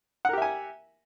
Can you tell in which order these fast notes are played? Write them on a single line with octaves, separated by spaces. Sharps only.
F#5 A#4 G4 E5 G#5